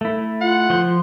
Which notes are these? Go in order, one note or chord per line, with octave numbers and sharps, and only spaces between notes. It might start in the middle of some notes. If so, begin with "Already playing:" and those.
A3 E4
F4 F#5
F3 C6 G6